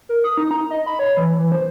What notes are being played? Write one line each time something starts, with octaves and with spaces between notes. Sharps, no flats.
A#4
D#6
D#4
A#5
D#5
B5
C#5
E3
E3
C5